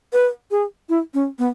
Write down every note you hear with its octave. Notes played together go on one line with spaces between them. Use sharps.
B4
G#4
E4
C#4
B3